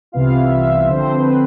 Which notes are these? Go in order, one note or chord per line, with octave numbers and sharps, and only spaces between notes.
C2 C3 E3 B3 F4 F5
E5
E5
D3 F3 C4 C5
B4